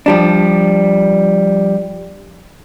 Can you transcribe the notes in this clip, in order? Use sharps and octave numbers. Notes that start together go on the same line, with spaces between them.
F3 G3 D4